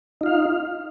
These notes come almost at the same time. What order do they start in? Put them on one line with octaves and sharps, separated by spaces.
D#4 F4 F5